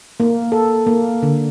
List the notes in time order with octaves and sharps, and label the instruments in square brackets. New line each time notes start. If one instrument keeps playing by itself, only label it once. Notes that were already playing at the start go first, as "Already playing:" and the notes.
[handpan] A#3
A4
A#3
D3